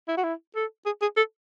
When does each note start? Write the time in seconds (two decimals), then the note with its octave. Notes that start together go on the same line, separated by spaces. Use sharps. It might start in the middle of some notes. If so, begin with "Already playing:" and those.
0.08 E4
0.17 F#4
0.24 E4
0.56 A4
0.86 G#4
1.02 G#4
1.17 A4